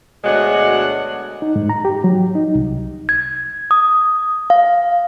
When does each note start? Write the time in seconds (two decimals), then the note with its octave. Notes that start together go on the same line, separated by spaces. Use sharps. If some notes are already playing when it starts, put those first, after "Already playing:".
0.24 D2 B2 G#3 D4 C#5 F#5
1.42 D#4
1.56 G#2
1.69 A#5
1.85 G4
2.04 F#3
2.35 D#4
2.55 C2
3.09 G#6
3.71 D#6
4.50 F5